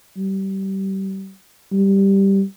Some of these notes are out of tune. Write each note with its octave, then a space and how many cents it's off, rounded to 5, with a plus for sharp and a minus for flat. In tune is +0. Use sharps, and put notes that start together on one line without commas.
G3 -25
G3 +0